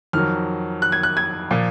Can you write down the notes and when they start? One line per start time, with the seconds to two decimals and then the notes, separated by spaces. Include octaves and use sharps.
0.13 F2 D#3 F#3 F6
0.82 F#6
0.92 G#6
1.03 F#6
1.17 G#6
1.51 A#2 F3